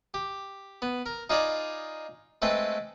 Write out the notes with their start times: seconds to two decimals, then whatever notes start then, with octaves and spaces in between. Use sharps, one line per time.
0.14 G4
0.82 B3
1.06 A#4
1.30 D#4 F4 G#4 D5 A#5 B5
2.42 G#3 A3 C4 B4 G5